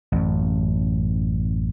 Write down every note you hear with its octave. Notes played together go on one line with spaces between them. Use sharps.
A1 F#2